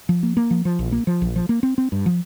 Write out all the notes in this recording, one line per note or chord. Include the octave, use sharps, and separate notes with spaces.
F3
A#3
A#3
F3
F3
A#1
A#3
F3
A#1
F3
A#3
C4
C4
G2
F3